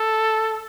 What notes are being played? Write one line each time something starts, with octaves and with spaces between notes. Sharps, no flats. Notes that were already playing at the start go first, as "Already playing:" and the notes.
Already playing: A4